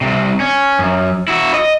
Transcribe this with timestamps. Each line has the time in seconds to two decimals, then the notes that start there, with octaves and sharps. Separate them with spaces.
0.01 C2 C3
0.40 C#4
0.79 F#2
1.28 E4 F#4
1.54 D#5